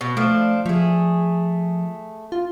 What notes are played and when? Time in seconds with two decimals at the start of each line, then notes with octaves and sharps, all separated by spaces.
0.01 B2
0.17 F3 A3 D4
0.66 F3 A3 G#4
2.32 F4